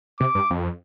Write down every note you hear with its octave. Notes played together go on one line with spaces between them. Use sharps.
C3 D6
G2
F2